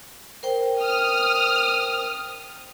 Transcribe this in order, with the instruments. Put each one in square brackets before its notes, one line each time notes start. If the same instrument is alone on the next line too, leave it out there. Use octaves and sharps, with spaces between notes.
[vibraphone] A#4 C5 G5
[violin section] D#6 F6